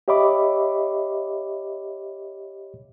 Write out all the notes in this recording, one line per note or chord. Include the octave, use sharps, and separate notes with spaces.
G4 C#5 D#5 E5 B5 D6